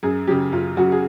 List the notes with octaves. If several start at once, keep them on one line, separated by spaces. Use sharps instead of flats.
F#2 G#4
C#3 F#3 G4
F#2 F4
C#3 F#3 F#4
G#4